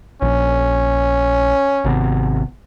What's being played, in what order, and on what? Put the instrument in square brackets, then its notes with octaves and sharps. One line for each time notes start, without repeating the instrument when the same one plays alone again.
[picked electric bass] A#1 [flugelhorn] C#4
[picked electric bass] G#1 C3 B3